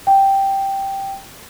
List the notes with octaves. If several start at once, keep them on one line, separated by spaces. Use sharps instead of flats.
G5